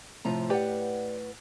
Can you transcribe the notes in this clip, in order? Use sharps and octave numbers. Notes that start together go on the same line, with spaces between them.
A2 C3 F3 A#5
G4 B4 D5 F#5 G5